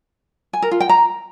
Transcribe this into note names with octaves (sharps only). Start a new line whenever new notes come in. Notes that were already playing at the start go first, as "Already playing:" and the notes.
G#5
A#4
F4
G5
A#5